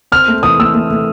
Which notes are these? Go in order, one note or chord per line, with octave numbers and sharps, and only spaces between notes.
C4 F6
A3
E3 D#6
A3 E6
A3
A3